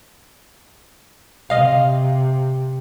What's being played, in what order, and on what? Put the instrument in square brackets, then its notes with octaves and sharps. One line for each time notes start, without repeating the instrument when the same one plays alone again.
[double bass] C3 [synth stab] D#5 F5